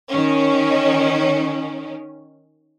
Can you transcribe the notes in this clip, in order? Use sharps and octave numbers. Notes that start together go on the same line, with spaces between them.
D#3 C#4